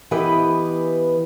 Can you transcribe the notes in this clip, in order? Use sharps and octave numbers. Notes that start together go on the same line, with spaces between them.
E3 B3 G4 B4 D#5